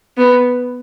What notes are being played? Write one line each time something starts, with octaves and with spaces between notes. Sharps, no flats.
B3